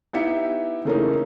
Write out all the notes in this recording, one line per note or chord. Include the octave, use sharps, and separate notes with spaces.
B3 D#4 E4 G4 E5 C#7
C#3 E3 A3 A#3 C#4 D#4